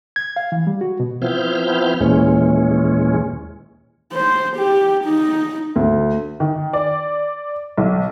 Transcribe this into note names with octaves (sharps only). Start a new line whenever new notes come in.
G#6
F5
E3
G3
F#4
B2
F3 B3 C4 E4 F6 G6
D#2 A#2 E3 G#3 C#4
C5
G4
D#4
D2
D#3
D5
B1